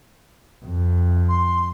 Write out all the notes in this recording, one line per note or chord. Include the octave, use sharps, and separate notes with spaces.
F2
C6